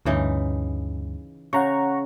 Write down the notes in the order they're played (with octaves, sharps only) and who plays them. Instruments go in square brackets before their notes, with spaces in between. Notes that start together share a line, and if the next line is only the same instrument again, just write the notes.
[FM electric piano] D2 G2 [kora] C#3 E3 D#4
[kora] C#3 [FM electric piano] F#5 A#5 C#6